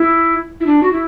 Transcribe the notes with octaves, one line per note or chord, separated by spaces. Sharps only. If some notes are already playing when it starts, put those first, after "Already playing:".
Already playing: E4
E4
D4
F#4
E4